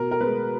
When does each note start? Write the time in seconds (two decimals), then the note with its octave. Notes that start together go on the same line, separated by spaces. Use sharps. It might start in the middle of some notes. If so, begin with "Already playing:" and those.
Already playing: B2 A#4
0.11 A#4
0.21 G#3 B3 B4